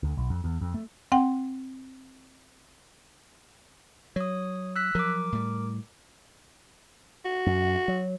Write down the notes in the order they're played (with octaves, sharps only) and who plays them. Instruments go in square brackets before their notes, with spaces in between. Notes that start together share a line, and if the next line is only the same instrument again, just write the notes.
[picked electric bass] D2
B1
F2
E2
F2
A3
[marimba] C4 F#5 G5
[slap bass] F#3 [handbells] C#5 D#6
[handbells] E6 F#6 B6
[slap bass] F3 F#3 [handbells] A#4 D6
[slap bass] A2 G3
[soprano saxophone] F#4
[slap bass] F#2
F#3